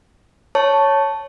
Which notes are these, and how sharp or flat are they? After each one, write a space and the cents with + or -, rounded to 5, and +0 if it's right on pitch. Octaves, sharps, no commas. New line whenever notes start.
C#5 +0 A5 +0 C#6 +0